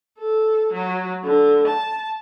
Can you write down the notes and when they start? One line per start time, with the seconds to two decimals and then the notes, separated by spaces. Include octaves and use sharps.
0.19 A4
0.72 F#3
1.23 D3
1.67 A5